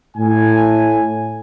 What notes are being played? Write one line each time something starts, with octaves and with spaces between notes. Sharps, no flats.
A2 G#5